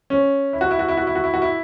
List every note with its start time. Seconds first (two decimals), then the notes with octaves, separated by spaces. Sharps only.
0.10 C#4
0.53 E4
0.61 F#4
0.71 E4
0.79 F#4
0.88 E4
0.97 F#4
1.07 E4
1.15 F#4
1.24 E4
1.34 F#4
1.42 E4